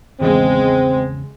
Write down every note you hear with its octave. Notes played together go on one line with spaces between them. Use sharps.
G#1 E2 C#3 G#3 C4